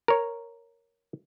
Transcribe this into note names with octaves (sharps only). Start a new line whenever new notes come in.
A#4 C#5